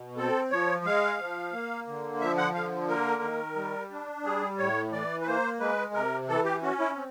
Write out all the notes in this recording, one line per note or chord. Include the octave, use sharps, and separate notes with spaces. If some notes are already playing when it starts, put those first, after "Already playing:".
Already playing: B2
C4 A4
F3 C#5
G#3 F5
F3
A#3
D3
F3 E5
F#5
D3 F5
A#3 A#4
D#3
G3
D4
G3 G#4
A2 C#5
E3 D5
B4
A#3 C5
G#3 B4
C3 A#4
E3 A4
G4
C#4 F#4
E4
C4